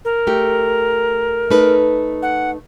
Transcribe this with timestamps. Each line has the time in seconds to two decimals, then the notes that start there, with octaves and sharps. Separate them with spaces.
0.05 A#4
0.27 A3 G4
1.50 A3 D#4 B4
2.22 F#5